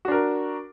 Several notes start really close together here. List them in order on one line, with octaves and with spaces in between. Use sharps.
F#4 D4 A#4